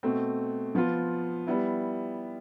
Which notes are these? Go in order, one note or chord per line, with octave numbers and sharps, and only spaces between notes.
B2 A3 C4
F3 B3 F4
G3 B3 E4